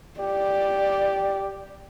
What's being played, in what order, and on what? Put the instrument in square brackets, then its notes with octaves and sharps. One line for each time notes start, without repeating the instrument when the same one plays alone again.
[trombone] G4 [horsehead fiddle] D5